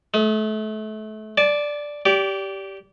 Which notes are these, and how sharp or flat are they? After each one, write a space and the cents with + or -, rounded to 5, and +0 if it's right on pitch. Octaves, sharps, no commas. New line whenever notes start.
A3 -30 D#6 +30
D5 +0 A5 -30
G4 -10 D5 -25